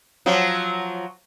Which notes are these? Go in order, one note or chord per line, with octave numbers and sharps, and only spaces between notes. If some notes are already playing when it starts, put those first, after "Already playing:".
F3 F#3